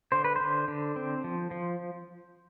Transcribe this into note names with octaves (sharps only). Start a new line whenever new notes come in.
D3 C5
B4
D3 C5
D3
C4
F3
F3